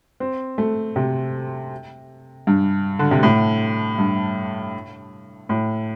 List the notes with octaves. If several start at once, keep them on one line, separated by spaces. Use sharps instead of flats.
C4
A3
C3
G2
D3
C3
A2
G2
A2